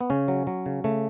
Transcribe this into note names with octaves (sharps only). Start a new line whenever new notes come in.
B3
C#3 C#4
F#3
F#3
C#3
C#3 A3